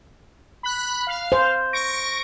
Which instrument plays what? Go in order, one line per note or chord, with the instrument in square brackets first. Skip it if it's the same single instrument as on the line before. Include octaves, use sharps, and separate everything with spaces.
[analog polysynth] B5 F#6
F5
[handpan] C5
[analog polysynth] C#6 A#6 D7